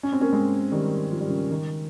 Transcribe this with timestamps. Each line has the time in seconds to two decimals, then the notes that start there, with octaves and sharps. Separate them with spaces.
0.03 C#4
0.13 C4
0.21 A#3 C#4
0.33 G#3 C4
0.72 D#3 G3
1.11 F3
1.20 G3
1.29 C#3 F3
1.51 D#3